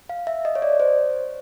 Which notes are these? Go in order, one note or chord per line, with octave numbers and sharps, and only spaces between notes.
F5
E5
D#5
C#5
D5
C5